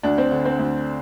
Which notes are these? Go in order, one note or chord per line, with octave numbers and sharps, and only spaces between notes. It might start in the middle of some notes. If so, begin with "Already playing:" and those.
D2 D4
C4
D3
C4
D2